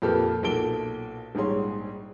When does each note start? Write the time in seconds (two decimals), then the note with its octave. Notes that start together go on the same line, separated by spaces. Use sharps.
0.02 F2 A#2 G4 A4 B4 F6
0.43 B1 A#2 A4 D7 G7
1.35 A#1 G#2 G3 G#4 C#5 C6